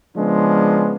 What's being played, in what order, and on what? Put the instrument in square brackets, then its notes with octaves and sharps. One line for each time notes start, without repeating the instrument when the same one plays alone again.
[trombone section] C#3 F3 G#3 B3 C#4 D4